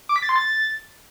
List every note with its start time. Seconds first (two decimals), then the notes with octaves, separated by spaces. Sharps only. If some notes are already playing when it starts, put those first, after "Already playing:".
0.09 D6
0.16 B6
0.22 A6
0.29 C6
0.36 A6